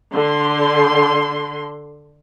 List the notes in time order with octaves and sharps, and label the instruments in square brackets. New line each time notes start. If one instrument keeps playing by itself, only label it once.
[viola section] D3 C6